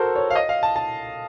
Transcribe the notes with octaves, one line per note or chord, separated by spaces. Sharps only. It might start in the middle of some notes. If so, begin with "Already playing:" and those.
Already playing: F#4 A4 A#4 C5
C#5
F5
D#5
F5
A5
A5